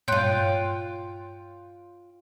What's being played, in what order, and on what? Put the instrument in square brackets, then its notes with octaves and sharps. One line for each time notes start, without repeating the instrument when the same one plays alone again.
[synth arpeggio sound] G2 A#2 [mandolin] F4 G5 [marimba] C#5 C6 F#6